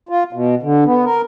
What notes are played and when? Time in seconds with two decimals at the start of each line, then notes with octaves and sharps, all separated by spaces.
0.09 F4
0.33 B2
0.63 D3
0.85 B3
1.05 A#4